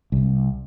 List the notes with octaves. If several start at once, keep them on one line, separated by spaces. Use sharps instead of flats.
C2